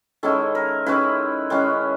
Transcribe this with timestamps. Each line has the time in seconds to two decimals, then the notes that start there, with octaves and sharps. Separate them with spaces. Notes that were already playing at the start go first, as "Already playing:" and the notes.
0.23 D#3 G#3 C#4 E4 A4
0.55 A#4
0.86 D#3 G#3 C#4 E4 B4
1.50 D#3 G#3 C#4 E4